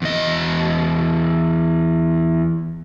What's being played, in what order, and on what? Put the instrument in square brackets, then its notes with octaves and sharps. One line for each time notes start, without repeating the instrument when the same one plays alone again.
[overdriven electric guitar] E2 D#5